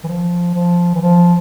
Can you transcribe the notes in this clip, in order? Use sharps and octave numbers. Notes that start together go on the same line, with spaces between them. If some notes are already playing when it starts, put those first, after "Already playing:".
E3
F3
F3
E3
F3